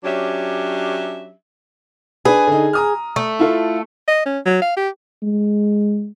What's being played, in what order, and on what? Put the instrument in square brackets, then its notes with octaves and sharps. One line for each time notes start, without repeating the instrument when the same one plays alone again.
[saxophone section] F#3 C#4 D4 G4 E5
[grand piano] D4 B4 [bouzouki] G#4
[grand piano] D3 D#4
A#5 D#6 F6
[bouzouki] A3
[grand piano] E4 F4 A4
[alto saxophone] D#5
C#4
F#3
F5
G4
[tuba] G#3